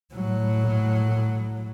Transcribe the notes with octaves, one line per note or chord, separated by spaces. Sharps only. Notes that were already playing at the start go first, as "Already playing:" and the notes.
A2 F#3